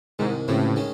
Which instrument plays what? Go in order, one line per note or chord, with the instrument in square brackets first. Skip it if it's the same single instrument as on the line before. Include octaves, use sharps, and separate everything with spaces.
[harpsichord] C2 C3 D#3 [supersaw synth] G#2
[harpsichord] C#2 C3 E3 C4 [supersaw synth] A2
[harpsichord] D#3 G#3 C#4